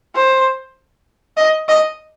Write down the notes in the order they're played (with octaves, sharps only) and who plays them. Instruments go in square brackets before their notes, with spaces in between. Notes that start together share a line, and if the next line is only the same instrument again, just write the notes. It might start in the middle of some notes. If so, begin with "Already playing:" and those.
[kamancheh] C5
D#5
D#5